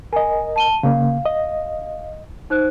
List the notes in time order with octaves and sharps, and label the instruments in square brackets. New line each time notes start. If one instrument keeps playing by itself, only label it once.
[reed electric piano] A#4 D#5 [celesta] G#5
[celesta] A5 D#7 G7
[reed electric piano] C#3 A#3 [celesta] F5
[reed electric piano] D#5
[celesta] D#4 C5 F#6